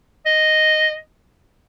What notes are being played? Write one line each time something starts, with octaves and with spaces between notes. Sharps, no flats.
D#5